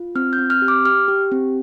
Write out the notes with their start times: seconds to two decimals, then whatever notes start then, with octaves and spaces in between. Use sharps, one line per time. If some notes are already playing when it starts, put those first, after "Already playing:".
Already playing: F4
0.15 C4 F6
0.33 G6
0.38 C4
0.50 F6
0.62 G4
0.68 D6
0.85 G4 F6
1.08 G4
1.32 C4